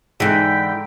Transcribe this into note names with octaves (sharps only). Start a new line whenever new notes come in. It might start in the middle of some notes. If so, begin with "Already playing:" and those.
G#2 D3 E3 G5 B6